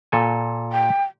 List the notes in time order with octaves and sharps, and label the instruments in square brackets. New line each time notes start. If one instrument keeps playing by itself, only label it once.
[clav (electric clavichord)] A#2 A4 G#5
[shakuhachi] G5